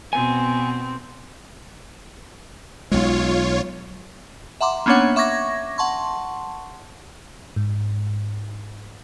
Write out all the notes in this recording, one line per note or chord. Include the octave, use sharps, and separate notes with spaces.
B2 B3 C4 G#5
B1 G#3 F4 C#5
E5 F#5 A#5 C6 D6
A#3 B3 C#4 D4 C#5 F#5
E5 C#6 D6 G#6 A#6
F#5 A5 C6 C#6
G#2